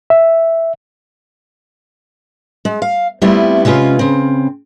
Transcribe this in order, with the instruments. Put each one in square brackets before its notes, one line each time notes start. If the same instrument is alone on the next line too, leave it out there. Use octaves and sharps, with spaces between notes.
[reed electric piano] E5
[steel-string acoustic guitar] G#3
F5
G3 A3 B3 C4 E4 F4
C3 G#3 C#4 F4 B4
C#3 C4